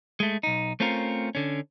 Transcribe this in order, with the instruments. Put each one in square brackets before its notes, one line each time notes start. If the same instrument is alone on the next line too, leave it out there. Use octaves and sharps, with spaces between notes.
[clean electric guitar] G#3 A3
B1 D#4
A3 C4 C#4 F4 A#4
D3 C#4